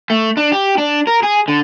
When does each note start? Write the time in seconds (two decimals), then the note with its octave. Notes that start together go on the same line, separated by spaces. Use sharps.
0.10 A3
0.37 D4
0.52 G4
0.78 D4
1.07 A#4
1.23 G#4
1.48 D3